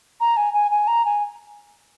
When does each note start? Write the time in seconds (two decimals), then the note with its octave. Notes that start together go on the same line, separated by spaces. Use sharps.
0.20 A#5
0.37 G#5
0.54 G#5
0.71 G#5
0.87 A#5
1.05 G#5